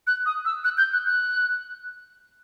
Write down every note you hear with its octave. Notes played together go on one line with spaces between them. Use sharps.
F#6
D#6
E6
F#6
G6
F#6
F#6